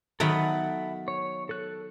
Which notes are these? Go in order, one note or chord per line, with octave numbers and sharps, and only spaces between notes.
D#3 F#3 B3 A4 E5 B5
C#5
A4 F#6